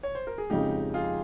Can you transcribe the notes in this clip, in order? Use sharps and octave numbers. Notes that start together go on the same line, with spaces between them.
C#5
C5
A#4
G#4
F2 C#3 G#3 D#4 G4
F4 G#4